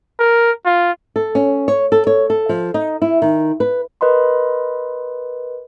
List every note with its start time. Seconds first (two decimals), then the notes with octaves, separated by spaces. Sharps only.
0.20 A#4
0.65 F4
1.16 A4
1.35 C#4
1.68 C#5
1.92 A4
2.07 C#5
2.30 A4
2.49 F3
2.74 D#4
3.02 E4
3.22 D#3
3.60 B4
4.01 A#4 B4 D#5 B5 C6